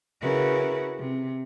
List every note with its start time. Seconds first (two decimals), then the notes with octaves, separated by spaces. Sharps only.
0.21 C#3 E4 F#4 G#4 A#4 B4
0.98 C3